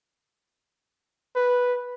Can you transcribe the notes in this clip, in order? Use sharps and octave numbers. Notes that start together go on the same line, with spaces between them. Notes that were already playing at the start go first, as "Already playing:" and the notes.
B4